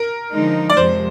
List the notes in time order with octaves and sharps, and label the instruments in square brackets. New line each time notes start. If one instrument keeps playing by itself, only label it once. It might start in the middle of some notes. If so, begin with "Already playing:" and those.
Already playing: [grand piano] A#4
[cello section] D3 F3 G#3 D#4
[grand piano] D5
[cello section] F2 C3 F3 G#3 [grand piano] C5